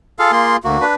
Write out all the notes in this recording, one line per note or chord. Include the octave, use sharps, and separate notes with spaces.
F4 G#4 A4 F5
A#3 C6
D2 A#3 F#4
D4 B4